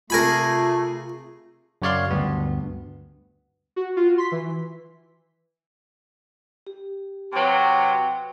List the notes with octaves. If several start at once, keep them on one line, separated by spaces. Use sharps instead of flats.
C3 A3 F4 G#4 A#4 G#5 B5
F#2 C#3 C#5 D5 F5 C6
D2 G2 B3
F#4
F4 F#4
C6 B6
E3
G4
C3 F#3 B4 G5